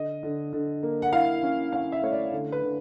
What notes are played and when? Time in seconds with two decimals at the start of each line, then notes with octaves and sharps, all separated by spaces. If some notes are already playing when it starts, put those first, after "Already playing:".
Already playing: D3 D#5
0.23 D3
0.53 D3
0.83 A#3
1.02 F#5
1.13 E4 F5
1.43 C#4
1.72 C#4 F5
1.92 E5
2.02 A3 C#5
2.12 D5
2.32 D3
2.52 B4
2.62 D3